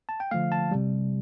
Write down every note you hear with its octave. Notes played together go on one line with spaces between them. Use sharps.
A5
G5
D3 F3 A3 F5
A5
C3 G3